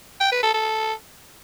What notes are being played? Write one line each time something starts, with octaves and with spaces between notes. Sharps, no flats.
G5
B4
A4
A4